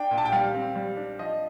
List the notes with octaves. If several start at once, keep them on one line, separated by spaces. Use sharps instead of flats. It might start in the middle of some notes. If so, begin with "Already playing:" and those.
Already playing: D4 G5
A#2
A5
G5
G3 F5
C4
G3
D4
F3 D#5